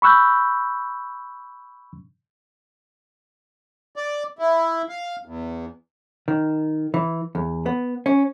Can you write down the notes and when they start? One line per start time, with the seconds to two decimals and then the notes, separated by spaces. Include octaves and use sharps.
0.02 B5 C#6 E6 F#6 G6
3.96 D5
4.39 E4
4.89 F5
5.26 E2
6.28 D#3
6.94 E3
7.35 E2
7.66 B3
8.06 C#4